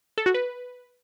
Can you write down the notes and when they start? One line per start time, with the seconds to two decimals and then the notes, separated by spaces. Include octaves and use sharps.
0.18 A4
0.26 F#4
0.34 B4